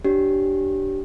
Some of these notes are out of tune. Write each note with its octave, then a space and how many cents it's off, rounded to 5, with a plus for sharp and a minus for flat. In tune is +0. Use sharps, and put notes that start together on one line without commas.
D4 +0 G4 -25 C#5 +0